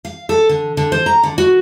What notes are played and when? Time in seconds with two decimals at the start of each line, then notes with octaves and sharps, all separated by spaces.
0.05 F5
0.29 A4
0.49 D3
0.77 D3
0.92 C5
1.06 A#5
1.23 D3
1.38 F#4